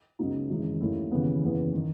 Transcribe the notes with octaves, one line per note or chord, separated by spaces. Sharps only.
C#2 C#3 F#3 B3 D#4
G#1 F#2 E3 G#3
D#2 D#3 A3 C#4 E4
D#2 C#3 E3 B3
F#1 E2 C#3 E3 B3
D#3